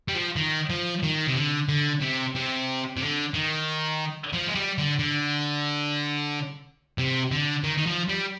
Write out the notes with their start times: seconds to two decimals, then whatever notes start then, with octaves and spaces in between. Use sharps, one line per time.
0.08 G3
0.14 F3
0.36 D#3
0.70 F3
1.03 D#3
1.27 C3
1.35 D3
1.69 D3
2.01 C3
2.35 C3
2.97 C3
3.01 D3
3.34 D#3
4.33 F3
4.47 G#3
4.55 G3
4.78 D3
4.99 D3
6.98 C3
7.32 D3
7.64 D#3
7.78 D#3
7.87 F3
8.09 G3